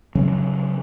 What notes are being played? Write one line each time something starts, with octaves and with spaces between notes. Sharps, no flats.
C#3 E3 F#3 C#4